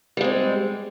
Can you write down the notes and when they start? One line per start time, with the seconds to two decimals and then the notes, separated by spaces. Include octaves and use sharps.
0.17 G3
0.21 G#3
0.24 C4